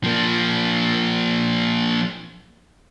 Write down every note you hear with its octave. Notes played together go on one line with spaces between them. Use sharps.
F3 A#3